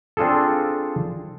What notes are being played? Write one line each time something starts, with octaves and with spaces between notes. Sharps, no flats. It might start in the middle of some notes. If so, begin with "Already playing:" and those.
C4 D4 F4 G#4 A4